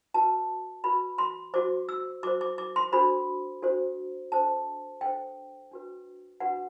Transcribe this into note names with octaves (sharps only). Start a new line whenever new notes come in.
F#4 B4 A5
F#4 B4 B5
C6
F#4 C5 D6
E6
F#4 C5 D6
D6
D6
C6
D4 F#4 A4 C5 B5
D4 F#4 A4 C5
D4 A4 C5 A5
D4 A4 C5 G5
D4 F#4 B4
D4 F#4 B4 F#5